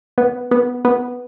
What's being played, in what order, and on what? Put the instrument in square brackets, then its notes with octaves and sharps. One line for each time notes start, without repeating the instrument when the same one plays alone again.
[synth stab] B3
B3
B3